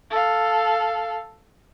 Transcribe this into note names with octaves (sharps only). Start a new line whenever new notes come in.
A4 F5